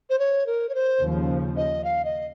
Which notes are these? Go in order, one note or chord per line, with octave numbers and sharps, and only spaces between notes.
C5
C#5
A#4
C#5
C5
D#2 C#3 F3
D#5
F5
D#5